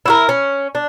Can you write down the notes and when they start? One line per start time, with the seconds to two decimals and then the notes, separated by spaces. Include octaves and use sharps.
0.06 E4 F#4 A#4
0.29 C#4
0.75 D4